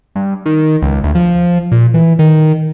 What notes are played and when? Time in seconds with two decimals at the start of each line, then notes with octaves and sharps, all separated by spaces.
0.15 G2
0.46 D#3
0.82 C#2
1.04 D2
1.15 F3
1.72 A#2
1.94 E3
2.19 D#3